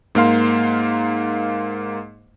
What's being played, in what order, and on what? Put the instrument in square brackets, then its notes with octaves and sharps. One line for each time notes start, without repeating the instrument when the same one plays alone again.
[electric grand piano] G#2 A#3 F5 C6